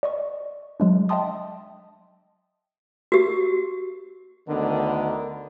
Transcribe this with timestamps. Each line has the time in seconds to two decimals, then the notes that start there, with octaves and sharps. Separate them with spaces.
0.03 D5 D#5 C#6
0.80 F#3 G#3 D4
1.09 D#5 E5 G5 A5 C6 D#6
3.12 F#4 G4
4.48 D2 D3 D#3 B3 A#4